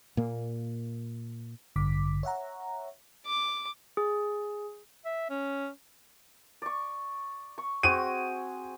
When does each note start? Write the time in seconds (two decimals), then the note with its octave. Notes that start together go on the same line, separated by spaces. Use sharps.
0.17 A#2 A#3
1.76 A1 G2 D3 D6 B6
2.23 C#5 E5 F#5 A#5
3.26 D6
3.97 G#4
5.05 E5
5.30 C#4
6.62 D5 C#6
7.58 C#6
7.83 C4 F#4 G#4 D#7